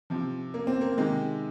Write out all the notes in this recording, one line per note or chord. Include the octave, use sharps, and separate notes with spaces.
C3 F3
A#3
C4
A#3
C3 D#3 G#3